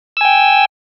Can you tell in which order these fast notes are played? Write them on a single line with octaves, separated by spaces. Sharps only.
E6 G#5 G5